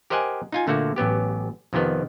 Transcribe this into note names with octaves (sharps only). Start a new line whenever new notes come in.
G4 A#4 C5 D#5 F#5 G#5
D#4 F4 G#5
A#2 D3 A3 A#3 F#4
A1 F#3 B3 G4
F2 C3 D#3 B3